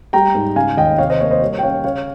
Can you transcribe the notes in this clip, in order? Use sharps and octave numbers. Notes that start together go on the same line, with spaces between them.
G3 G5 A#5
G#2
C#3 F5 G#5
D#2 D#5 G5
C3 C#5 F5
C5 D#5
A#3 C#5
C5 D#5
G3 C#5
G5
C#4 C#5 F5
C#3 C#5 F5